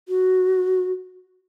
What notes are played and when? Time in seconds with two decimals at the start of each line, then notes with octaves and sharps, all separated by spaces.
0.08 F#4